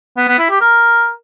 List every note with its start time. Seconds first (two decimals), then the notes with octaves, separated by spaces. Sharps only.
0.17 B3
0.28 B3
0.39 E4
0.50 G4
0.61 A#4